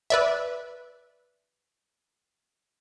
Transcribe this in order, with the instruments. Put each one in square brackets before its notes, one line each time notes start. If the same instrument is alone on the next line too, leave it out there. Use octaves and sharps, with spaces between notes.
[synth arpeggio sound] B4 D5 E5